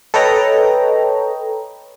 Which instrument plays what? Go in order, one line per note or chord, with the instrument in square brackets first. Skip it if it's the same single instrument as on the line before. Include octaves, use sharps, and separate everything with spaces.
[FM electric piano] A4 B4 C#5 D#5 G5 A#5